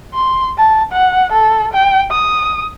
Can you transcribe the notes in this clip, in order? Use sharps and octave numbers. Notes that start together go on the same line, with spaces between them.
C6
A5
F#5
A4
G5
D#6